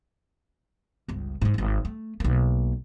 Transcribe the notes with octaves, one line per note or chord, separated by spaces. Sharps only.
G1 C#2
G#2 G#3
D1 G#1
A3
B1 A#3